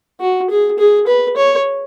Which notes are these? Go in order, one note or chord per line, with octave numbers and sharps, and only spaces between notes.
F#4
G#4
G#4
B4
C#5